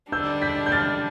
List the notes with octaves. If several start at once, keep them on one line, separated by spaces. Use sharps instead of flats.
D3 G3 D4 E6 G6
G6 B6
G6
F6 A6